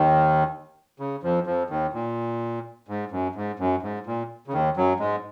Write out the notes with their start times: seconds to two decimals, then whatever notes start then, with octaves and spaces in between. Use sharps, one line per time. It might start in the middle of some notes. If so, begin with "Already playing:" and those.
Already playing: D#2 D#3
1.00 C#3
1.23 F2 F3
1.47 F2 F3
1.70 D#2 D#3
1.93 A#2
2.88 G#2
3.11 F#2
3.35 G#2
3.59 F#2
3.83 G#2
4.06 A#2
4.48 C#3
4.53 D#2 D#3
4.77 F#2 F#3
4.99 G#2 G#3